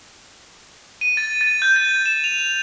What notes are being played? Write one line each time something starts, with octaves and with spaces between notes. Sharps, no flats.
D#7
A6
A6
G6
A6
G6
E7
F7
F7